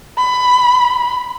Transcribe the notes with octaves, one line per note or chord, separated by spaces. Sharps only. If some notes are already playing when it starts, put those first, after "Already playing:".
B5